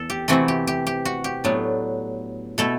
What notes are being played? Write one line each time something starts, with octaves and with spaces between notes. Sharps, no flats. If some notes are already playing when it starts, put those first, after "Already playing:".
Already playing: E2 A4
G4
C3 E3 A3 C4 E4 F#4
G4
G4
G4
F#4
G4
A2 F#3 B3 D4
B2 A3 E4 A4